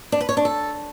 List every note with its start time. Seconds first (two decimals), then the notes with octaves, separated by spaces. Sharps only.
0.12 D4
0.21 B4
0.29 C#5
0.37 D4
0.45 A4